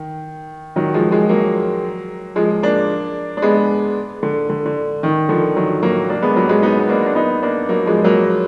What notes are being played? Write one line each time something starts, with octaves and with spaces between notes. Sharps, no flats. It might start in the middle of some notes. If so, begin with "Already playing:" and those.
Already playing: D#3
D#3 F#3
F3 G#3
F3 G#3
F#3 A#3
F3 G#3
A#3 D4
D4
G#3 B3
D3
D3
D3
D#3
D3 F3
D#3 F#3
F#3 A#3
A#3 D4
G#3 B3
F#3 A#3
G#3 B3
B3 D#4
B3
A#3 D4
D4
B3 D#4
A#3 D4
F#3 A#3
F3 G#3
F#3 A#3